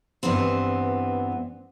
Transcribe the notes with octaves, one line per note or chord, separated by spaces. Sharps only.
G2 E3 B3 C4